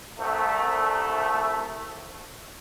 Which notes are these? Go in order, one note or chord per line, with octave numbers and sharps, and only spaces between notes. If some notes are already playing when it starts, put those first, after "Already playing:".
C2 A3